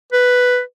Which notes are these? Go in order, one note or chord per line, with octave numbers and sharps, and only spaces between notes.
B4